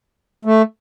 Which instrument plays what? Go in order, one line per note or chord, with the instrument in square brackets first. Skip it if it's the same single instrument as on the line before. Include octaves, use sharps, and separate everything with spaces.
[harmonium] A3